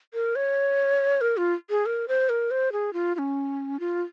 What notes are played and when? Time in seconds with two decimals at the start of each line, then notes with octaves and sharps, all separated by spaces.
0.14 A#4
0.36 C#5
1.21 A#4
1.37 F4
1.70 G#4
1.86 A#4
2.08 C5
2.29 A#4
2.51 C5
2.72 G#4
2.93 F4
3.15 F4
3.19 C#4
3.80 F4